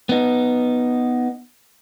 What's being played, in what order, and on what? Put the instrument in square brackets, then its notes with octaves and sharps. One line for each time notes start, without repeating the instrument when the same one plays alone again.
[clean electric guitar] B3 D#4